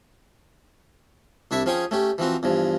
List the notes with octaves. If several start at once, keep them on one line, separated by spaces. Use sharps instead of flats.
C2 D4 E4 E5 C#6
F3 C#4 G#4 G5 C#6 D#6
A3 C#4 G4
E3 F3 C4 F#4
E2 G2 F3